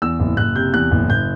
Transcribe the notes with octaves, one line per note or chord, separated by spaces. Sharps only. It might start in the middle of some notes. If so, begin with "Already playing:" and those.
E2 E6
F#1
F#1 F#6
C3 G6
E2 F#6
F#1
F#1 G6